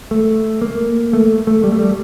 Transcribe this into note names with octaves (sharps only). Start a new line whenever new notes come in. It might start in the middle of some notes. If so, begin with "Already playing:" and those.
A3
A#3
A3
A3
G3
A3
G3